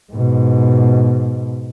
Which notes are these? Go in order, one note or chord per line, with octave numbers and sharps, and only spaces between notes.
G#2 B2